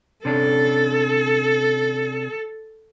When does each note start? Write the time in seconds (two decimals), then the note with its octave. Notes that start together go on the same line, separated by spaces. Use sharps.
0.25 C3 C#4 D4 A4